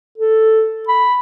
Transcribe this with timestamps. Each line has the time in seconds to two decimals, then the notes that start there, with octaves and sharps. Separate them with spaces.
0.18 A4
0.88 B5